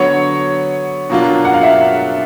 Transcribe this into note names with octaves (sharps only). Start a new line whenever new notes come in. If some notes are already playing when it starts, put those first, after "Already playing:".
Already playing: D3 F#3 B3 C#5
B2 F#3 A#3 D4 F4
F#5
F5
E5